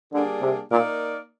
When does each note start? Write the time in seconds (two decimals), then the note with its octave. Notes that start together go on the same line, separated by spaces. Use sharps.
0.12 D3 G3 A#3 D4 G#4
0.42 C3
0.71 A#2 A#3 D#4 A#4 D5